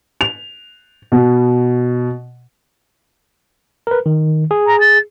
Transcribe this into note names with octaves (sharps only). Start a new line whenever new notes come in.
F7
B2
A#4 B4
D#3
G#4
A#5
A6